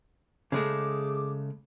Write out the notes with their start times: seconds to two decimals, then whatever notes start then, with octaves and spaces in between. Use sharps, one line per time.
0.52 C#3 G#3 A3 G#4 D6